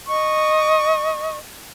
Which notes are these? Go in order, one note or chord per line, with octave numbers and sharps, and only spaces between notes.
D#5 C#6